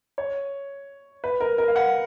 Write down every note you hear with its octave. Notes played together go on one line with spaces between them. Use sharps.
C#5
B4
A#4
A#4
F5
F#5